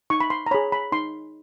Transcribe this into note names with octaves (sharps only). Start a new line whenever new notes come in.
D#4 C#6
B5
C6
A#5
G#4 C#5 B5
B5
D#4 C6